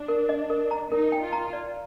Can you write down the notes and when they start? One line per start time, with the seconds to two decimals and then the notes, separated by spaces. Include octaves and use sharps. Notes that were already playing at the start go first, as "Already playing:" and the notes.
Already playing: D4
0.08 A#4
0.29 D#5
0.50 A#4
0.71 A#5
0.91 D#4 A#4
1.12 G5
1.22 F4
1.33 A#5
1.53 D5